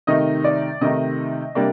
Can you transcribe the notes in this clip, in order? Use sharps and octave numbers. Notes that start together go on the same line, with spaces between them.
C3 D#3 A3 D#4 D#5
D5
C3 D#3 A3 D#4 D#5
C3 G3 A#3 D4